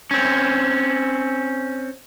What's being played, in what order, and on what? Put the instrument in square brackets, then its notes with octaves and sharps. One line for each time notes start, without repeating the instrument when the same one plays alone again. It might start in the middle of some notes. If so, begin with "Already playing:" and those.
[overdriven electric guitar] C4 C#4